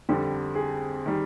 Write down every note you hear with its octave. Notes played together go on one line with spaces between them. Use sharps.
F2 D3 G3
G#4
D#3 G3